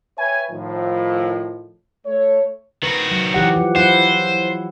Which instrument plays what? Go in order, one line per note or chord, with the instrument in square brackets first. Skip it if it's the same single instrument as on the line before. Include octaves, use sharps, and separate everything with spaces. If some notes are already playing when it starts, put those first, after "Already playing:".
[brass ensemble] B4 C#5 E5 G5 G#5
A2 D#3 F3
A3 C#5
[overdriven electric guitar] D#3 F#4 [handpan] B4
[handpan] F#3
E3 G4 F#5
F3
[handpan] F#3 E4 F#5 [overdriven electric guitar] C5